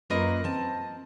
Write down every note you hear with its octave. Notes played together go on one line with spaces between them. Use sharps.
F#2 A#3 F4 A#4 B4 D#5
C4 A5